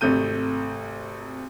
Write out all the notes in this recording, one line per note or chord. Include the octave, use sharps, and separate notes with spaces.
G#1 C3 A3 G6 D#7